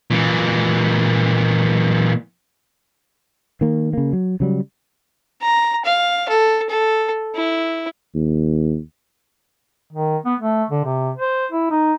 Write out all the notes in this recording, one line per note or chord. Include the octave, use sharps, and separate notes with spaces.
A#2 E3
D#3 A#3
C#3 A#3
F#3
C#3 F#3 G3
A#5
F5
A4
A4
E4
D#2
D#3
B3
A3
D3
C3
C5
E4
D#4